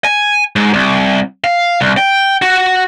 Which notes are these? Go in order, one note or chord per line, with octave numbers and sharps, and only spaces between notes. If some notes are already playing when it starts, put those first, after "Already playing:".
G#5
G#2
C2
F5
C2
G5
F#4